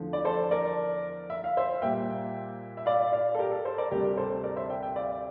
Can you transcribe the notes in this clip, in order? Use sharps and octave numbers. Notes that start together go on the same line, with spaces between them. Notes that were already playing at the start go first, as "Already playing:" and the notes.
Already playing: E2 D3 F3 A3
D5
A4 C5
A#4 D5
E5
F5
C5 E5
A#2 G3 A#3 E5 G5
E5
D5 F5
D5 F5
A4
G4 A#4
A4
A4 C5
A#4 D5
D2 C3 G3 G4 A#4
A4 C5
A#4 D5
C5 E5
E5 G5
E5 G5
D5 F5